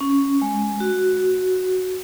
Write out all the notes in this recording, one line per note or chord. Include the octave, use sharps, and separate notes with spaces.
C#4
G#3
F#4